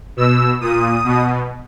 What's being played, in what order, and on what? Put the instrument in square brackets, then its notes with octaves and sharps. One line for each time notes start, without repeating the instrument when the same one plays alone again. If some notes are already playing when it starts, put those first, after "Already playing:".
[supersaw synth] B2 E6
A#2 D#6
B2